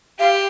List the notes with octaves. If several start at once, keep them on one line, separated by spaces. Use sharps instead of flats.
G4 F5